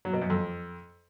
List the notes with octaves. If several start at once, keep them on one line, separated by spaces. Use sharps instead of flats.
F#3
B2
F#2
F2